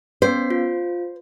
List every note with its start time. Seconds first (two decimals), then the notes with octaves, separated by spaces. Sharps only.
0.22 B3 C#4 C5 B6
0.51 F4